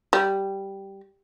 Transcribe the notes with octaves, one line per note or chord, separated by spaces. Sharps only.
G3